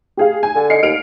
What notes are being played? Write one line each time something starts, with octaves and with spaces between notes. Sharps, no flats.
G4 G#4 F5
G#5
D3
D#5 C7 C#7
D#2 F6 D7 F7